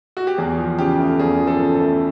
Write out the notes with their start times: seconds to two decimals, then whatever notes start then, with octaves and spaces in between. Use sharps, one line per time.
0.17 F#4
0.27 G4
0.38 E2 G#4
0.58 F3
0.78 C#3 G4
0.99 A3
1.19 E2 G#4
1.40 F3
1.47 A4
1.61 C#3
1.74 A4
1.81 A3